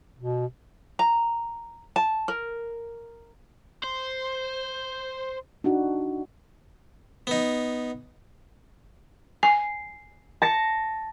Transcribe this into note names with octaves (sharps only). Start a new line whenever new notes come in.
B2
A#5
A5
A#4
C5
D4 D#4 F#4
B3 D#4
G#5 C7
A5 A#6 C#7